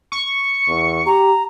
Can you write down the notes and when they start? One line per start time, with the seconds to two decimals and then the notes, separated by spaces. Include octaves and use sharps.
0.12 C#6
0.68 E2
1.06 G4 A#5